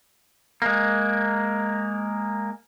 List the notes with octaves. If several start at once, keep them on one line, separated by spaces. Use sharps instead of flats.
G#3 A#3